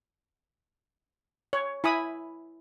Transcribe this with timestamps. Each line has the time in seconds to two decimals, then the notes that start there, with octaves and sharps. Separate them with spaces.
1.53 C#5
1.84 E4 G#5 B5 D#6